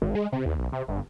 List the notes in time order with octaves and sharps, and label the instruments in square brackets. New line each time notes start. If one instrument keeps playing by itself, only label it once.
[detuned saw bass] G#1
G#3
C3
D#2
B1
C3
G1